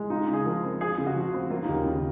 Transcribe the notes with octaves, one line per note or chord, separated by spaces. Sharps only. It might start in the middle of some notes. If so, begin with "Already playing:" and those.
Already playing: G#3
D#4 F4
C#3
G#4
F3 A#4
C4
F4 G#4
C#3 G#4
F#4
F3
C4
A#3 F4
D#4
D#2
C#4
C#3